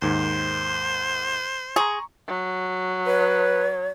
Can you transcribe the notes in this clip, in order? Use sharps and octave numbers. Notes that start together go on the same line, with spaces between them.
D#2 G#2 D#3 C5
G#4 A#5 C6 C#6
F#3
B4 C#5